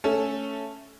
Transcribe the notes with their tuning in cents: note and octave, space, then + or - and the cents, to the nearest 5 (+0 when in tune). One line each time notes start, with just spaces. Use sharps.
A3 +0 C#4 +0 A4 +0